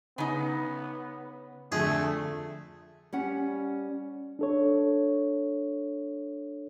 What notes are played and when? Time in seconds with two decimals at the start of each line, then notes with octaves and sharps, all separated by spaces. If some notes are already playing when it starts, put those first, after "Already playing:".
0.18 C#3 B3 D#4
1.72 F2 D3 A3 G#4
3.13 G3 C#4 F#5
4.39 D4 A4 C#5